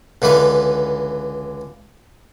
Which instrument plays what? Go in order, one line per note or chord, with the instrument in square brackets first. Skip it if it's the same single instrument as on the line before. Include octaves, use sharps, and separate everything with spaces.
[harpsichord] C#2 D3 E3 B4